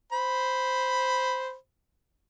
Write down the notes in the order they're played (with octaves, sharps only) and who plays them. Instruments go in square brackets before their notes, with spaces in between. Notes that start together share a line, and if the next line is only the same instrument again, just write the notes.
[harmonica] C5 B5